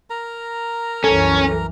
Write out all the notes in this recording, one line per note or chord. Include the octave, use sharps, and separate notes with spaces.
A#4 A#5
C2 F#2 E3 C#4 A4